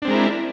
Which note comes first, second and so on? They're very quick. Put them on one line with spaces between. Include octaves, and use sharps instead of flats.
D4 C4 G#3 A#4 E4